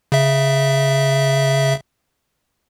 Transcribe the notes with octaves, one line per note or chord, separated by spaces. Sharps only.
C#3 E5